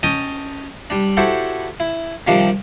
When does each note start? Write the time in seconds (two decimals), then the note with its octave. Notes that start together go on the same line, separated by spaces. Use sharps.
0.03 C#4 D#5 G5 A5 D#6
0.90 G3 D4
1.17 E4 F#4 G4 A4 C5
1.80 E4
2.27 C3 D#3 F3 G3 D4